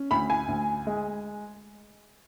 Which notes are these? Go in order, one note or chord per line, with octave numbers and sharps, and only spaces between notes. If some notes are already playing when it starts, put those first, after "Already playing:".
Already playing: C#4
D2 B5
G#5
D2
G#3